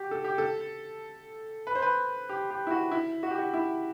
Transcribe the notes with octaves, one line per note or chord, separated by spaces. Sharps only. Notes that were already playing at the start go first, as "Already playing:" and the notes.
Already playing: F#4 G4
A4
G4
A4
B4
C5
B4
G4
G4
E4
F#4
E4
F#4
G4
F#4
E4